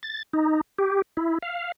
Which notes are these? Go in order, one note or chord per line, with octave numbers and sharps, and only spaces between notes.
A6
D#4
G4
E4
F5